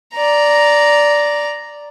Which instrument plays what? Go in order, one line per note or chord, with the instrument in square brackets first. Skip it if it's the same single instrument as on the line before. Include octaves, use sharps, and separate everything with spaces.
[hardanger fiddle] D5 A#5